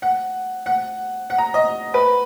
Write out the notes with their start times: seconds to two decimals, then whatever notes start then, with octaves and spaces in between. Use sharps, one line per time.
0.02 F#5
0.66 F#5
1.30 F#5
1.38 A#5
1.54 D#5
1.94 B4